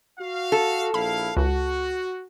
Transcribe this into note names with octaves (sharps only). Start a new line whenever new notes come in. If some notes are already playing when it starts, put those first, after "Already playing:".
F#4 F5
A4
A#1 E4 F5 B5
C#2 F#4